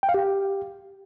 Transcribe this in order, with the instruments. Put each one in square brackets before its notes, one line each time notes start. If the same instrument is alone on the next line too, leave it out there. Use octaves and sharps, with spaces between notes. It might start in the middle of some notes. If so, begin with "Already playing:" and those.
[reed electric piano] G5
F5
G4